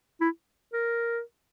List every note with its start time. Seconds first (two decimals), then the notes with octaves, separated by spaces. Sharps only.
0.21 E4
0.73 A#4